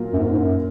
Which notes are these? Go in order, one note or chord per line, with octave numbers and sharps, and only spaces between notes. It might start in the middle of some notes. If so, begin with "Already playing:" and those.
Already playing: A#2 F#3 A#3 F4 A#4
F#2
G#2
G#2
F#2